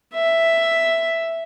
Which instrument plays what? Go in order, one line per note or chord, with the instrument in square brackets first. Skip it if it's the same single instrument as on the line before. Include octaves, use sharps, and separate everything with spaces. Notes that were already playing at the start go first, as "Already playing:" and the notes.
[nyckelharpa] E5